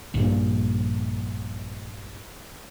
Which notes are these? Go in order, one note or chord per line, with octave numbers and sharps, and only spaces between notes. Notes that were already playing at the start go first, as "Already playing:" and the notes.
A#1 G2 A#2